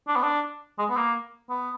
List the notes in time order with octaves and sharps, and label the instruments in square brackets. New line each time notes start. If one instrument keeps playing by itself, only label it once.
[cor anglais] D4
B3
D4
G#3
B3
A#3
B3